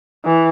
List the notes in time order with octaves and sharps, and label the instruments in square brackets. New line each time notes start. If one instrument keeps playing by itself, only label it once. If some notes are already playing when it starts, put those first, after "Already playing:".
[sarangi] E3